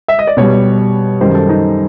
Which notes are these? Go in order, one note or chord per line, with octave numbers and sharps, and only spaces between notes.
E5
D#5
D5
B2 G3 C#5
F#2 D#3 G3 C5
A4
D#4